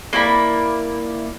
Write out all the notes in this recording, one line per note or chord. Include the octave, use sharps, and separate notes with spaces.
A#3 E4 D5 B5